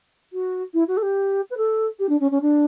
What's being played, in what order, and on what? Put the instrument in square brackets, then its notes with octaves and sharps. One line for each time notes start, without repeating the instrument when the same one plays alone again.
[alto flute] F#4
E4
F#4
A4
G4
B4
A4
G4
D4
C#4
C#4
D4